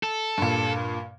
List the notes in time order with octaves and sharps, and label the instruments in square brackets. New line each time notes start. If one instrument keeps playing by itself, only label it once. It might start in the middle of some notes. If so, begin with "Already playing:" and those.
[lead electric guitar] A4
[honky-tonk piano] G2 A#2